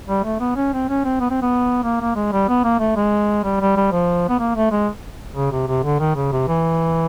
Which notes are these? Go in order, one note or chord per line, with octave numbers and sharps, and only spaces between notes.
G3
A3
B3
C#4
C4
C#4
C4
B3
C4
B3
A#3
A#3
G#3
G3
B3
A#3
A3
G#3
G3
G3
G3
F3
B3
A#3
A3
G#3
C#3
C3
C3
D3
D#3
C#3
C3
E3